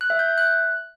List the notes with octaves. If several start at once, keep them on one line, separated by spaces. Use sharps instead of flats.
F#6
E5
G6
E5
F#6